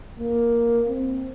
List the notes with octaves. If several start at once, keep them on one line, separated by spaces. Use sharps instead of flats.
A#3
C4